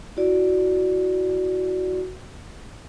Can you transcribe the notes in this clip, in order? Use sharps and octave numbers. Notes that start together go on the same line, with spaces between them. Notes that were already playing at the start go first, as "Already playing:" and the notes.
E4 F#4 D5